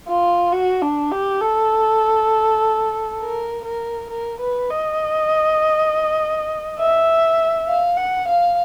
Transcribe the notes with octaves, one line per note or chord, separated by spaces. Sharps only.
F4
F#4
D4
G4
A4
A#4
A#4
A#4
B4
D#5
E5
F5
F#5
F5